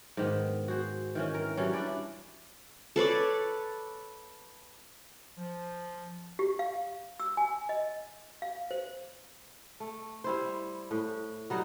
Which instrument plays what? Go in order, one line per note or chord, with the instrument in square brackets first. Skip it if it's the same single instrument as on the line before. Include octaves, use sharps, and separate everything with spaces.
[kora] G#2 D#3 B3
F#4 G#4 C5
D#3 E3 C#4
A#4
E3 F#3 G3 C#4
D4 E4 B4 D5
[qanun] A4 B4 C#5 D5
[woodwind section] F3
[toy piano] G4
F5
E6
G#5
D#5
F5
C5
[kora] A3
G3 E4 C5
A2
F#3 G3 D#4